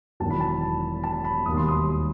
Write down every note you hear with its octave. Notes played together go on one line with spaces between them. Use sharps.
E1 E2 D#3 F#3 A5
B5
A5
A5
B5
E1 D#2 D#3 G3 D#6
C6
D#6